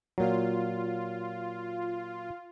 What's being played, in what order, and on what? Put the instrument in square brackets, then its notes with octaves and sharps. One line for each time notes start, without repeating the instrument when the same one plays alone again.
[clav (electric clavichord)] A#2 F#3 [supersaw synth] F4